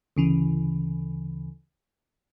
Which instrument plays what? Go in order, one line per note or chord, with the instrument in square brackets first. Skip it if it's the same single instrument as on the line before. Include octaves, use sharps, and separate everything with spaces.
[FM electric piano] D2 C#3 E3